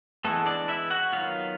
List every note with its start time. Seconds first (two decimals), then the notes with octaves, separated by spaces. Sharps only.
0.24 E3 G#3 A3 B3 A4
0.46 D4 D5
0.68 E4 E5
0.90 F#4 F#5
1.13 D#3 F#3 B3 F4 F5